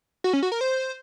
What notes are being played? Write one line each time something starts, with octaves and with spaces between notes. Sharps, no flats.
F#4
C#4
F#4
A#4
C5